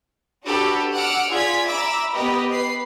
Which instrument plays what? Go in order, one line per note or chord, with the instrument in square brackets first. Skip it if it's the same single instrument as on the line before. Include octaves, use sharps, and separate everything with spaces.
[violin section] D4 F#4 G4 A4 B4
F#5 D6 E6 F6
F4 G#4 D5 G#6 B6
E5 A#5 B5 D6 E6
B3 G4 A#4 B4 D#5
B4 B5 C7